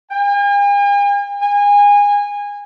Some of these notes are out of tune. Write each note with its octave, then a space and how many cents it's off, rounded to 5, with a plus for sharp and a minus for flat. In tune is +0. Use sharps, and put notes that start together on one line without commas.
G#5 -45
G#5 -25